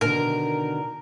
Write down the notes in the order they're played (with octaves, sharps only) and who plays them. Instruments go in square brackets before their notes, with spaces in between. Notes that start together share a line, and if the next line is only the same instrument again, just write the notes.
[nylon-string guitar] B2 D3 D#3 [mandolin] A#4